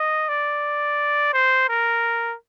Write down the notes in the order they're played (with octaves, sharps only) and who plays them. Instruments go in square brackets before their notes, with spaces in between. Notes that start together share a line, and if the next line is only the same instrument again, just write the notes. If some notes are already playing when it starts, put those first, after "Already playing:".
Already playing: [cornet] D#5
D5
C5
A#4